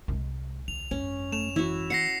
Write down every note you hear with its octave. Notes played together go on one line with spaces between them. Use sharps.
C2 C3 G#3
D#2 F7
G#1 F#2 C#4
A3 E7 F7
E3 E4 F#4
F#5 A#6 C7 C#7